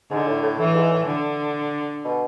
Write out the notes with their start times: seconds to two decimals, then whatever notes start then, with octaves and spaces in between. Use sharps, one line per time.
0.11 G#2 D3
0.28 A2
0.43 A2
0.59 A2 E3
0.75 G#2
0.91 A2
1.07 D3
2.05 B2